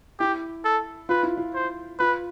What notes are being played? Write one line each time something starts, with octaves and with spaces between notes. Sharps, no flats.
E4 G4
A4
F4 B4
E4
F4
C5
F4 B4